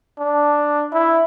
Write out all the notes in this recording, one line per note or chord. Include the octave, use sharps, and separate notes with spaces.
D4
E4